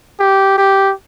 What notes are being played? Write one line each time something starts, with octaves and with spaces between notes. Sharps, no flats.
G4
G4